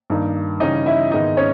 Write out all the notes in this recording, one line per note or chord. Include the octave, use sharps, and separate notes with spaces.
G2 D#3 A#3 D#4
C#3 E3 G3 C#4 D#4 D#5
E4 E5
G#2 D#3 G#3 B3 D#4 D#5
C#4 C#5